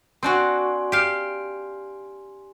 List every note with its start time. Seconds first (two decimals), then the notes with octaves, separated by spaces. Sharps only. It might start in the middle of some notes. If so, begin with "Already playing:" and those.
0.23 C4 D4 F#4 G#5 C6
0.92 G4 F5